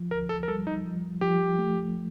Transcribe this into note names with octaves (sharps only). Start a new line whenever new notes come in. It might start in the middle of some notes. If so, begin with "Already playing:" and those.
Already playing: F3
D2 A#4
A4
A#4
G3 A4
D#4
F3
F3 G4
A3